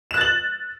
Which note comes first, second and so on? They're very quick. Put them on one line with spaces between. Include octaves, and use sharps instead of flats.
E7 F#6 A6 F#7